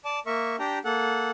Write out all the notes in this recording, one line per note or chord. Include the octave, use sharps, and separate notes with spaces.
D5 A5
A#3 A#4 E5 C#6
D4 G4 G5 A#5
A#3 A4 F#5